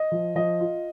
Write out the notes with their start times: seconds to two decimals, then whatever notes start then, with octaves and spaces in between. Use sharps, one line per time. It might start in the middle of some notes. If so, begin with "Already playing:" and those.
Already playing: D#5
0.12 F3
0.35 F3 D#5
0.61 F4